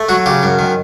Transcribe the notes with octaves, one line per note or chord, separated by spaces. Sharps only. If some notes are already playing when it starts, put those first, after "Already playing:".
Already playing: A3
F#3 F#4
C#3 G4
F#2
D#3